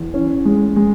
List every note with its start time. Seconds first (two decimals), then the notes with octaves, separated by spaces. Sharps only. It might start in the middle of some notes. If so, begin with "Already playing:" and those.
Already playing: E2
0.14 E3 C#4
0.45 G#3
0.76 G#3